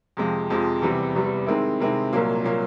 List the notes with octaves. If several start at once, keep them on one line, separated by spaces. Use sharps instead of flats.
F2 C3 F3 G#3
F2 C3 F3 G#3
E2 C3 E3 G3
E2 C3 E3 G3
C3 D#3 G#3 C4 E4
C3 D#3 G#3 C4 E4
C2 A#2 F#3 A#3
A#2 F#3 A#3